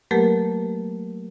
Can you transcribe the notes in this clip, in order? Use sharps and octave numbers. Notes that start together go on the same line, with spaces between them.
F#3 A3 A#3 G4 A#4 B4